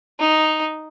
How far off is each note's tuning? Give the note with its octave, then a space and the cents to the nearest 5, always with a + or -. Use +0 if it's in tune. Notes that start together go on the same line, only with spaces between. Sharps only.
D#4 +0